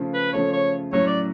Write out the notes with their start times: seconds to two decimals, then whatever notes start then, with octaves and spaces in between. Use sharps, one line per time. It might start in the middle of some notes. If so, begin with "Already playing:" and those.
Already playing: C#3 F3 A3
0.14 B4
0.33 C#3 F3 A3 C#5
0.53 C#5
0.93 A2 F#3 C#4 C#5
1.07 D5